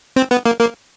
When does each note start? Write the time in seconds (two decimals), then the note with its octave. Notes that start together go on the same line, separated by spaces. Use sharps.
0.16 C4
0.31 B3
0.45 A#3
0.60 A#3